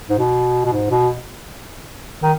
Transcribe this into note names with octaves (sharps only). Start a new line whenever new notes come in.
G#2
B2
B2
G#2
B2
D#3